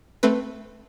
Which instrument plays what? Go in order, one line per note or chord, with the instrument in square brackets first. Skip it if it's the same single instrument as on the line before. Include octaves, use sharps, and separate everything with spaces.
[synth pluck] A3 C4 B4